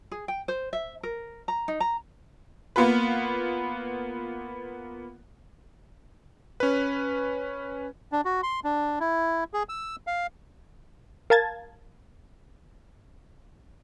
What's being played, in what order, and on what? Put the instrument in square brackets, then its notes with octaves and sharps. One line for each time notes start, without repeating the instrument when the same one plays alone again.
[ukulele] G#4
G5
C5
E5
A#4
A#5
D#4
A#5
[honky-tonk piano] A#3 B3 F4 B4
[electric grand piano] C#4 B4
[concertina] D4
F#4
C6
D4
E4
G#4
E6
F5
[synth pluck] A#4 F5 A5 G#6 A6